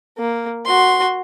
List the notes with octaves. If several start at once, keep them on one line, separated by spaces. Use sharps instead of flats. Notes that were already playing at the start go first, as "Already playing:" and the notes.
A#3
F#4 C6